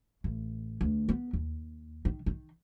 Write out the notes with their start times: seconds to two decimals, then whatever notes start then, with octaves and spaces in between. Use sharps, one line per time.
0.24 A1
0.81 D2
1.09 B3
1.33 D#2
2.05 D#3
2.26 D#3